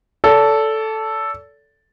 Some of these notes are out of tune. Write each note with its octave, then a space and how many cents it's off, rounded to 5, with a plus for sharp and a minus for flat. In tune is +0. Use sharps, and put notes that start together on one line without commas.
A4 +0 D5 -40